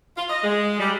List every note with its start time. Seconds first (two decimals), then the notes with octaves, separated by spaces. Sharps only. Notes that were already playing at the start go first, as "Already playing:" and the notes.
0.17 F4
0.30 D#5
0.43 G#3
0.79 G3